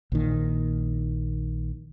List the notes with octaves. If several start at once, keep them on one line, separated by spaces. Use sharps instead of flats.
A#1 A#2 D#3